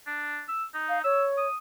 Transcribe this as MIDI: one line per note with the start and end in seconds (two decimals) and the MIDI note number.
0.07 0.41 62
0.48 0.64 88
0.74 1.02 63
0.89 0.99 77
1.04 1.47 73
1.04 1.25 88
1.37 1.57 87